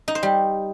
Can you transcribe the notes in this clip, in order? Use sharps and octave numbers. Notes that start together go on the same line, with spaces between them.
D#4
C5
G3